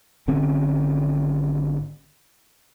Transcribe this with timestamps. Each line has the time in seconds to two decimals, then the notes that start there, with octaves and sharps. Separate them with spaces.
0.27 G#1 D3 C4 C#4